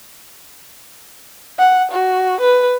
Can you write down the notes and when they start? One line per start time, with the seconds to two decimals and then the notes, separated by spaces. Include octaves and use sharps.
1.58 F#5
1.91 F#4
2.41 B4